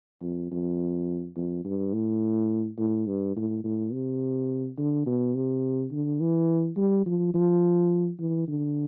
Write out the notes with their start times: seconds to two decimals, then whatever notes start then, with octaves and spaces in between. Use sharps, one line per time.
0.22 F2
0.51 F2
1.36 F2
1.65 G2
1.93 A2
2.78 A2
3.07 G2
3.36 A2
3.64 A2
3.93 C3
4.77 D3
5.06 B2
5.35 C3
5.92 D3
6.20 E3
6.77 G3
7.06 F3
7.34 F3
8.19 E3
8.48 D3